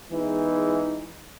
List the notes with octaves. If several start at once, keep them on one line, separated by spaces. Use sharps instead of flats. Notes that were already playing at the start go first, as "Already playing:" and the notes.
E2 E3 G#3 D#4